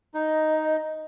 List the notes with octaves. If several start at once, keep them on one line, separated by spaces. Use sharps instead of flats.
D#4 D#5